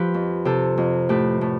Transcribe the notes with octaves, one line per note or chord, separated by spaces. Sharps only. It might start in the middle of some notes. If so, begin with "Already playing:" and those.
Already playing: F3 G4 B4
F2
C3 A4 C5
F2
A2 G4 B4
A2